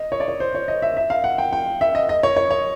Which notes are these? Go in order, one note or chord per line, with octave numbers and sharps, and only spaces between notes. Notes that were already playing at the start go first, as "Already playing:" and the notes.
Already playing: D#5
C#5
D5
C#5
C5
C#5
D#5
E5
E5
F5
F#5
G5
G5
E5
D#5
D#5
C#5
C#5
C#5